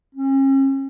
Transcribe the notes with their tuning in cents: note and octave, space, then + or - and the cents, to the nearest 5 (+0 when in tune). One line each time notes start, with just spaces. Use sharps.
C#4 -40